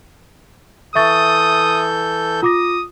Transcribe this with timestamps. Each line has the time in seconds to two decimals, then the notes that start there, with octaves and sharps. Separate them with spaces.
0.95 E3 A4 E5 C#6 D#6 G6 A6
2.43 F4 D6 D#6 A#6